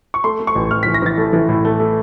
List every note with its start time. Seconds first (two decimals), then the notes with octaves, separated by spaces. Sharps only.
0.14 C#6
0.24 A3 C6
0.40 A3
0.47 C#6
0.55 A1
0.71 A1 F6
0.83 B6
0.86 E3
0.94 A#6
1.02 E3 A6
1.18 A3
1.33 E3
1.49 A2
1.65 A3
1.80 A3